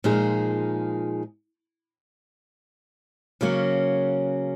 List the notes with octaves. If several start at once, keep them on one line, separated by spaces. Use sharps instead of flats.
A#2 F3 G#3 D#4 G#4
C#3 F#3 A#3 C#4 F#4